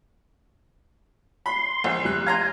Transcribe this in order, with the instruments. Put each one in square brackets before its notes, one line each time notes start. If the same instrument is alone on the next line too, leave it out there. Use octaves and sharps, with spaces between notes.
[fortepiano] B5 [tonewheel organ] C6
[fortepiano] A#1
[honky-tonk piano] F1 G3 F#6
[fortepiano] F5 A#5 C6 [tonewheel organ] G#5